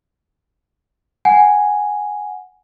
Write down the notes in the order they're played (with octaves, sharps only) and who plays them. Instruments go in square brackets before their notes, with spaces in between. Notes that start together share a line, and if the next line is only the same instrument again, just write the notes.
[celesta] F#5 G#5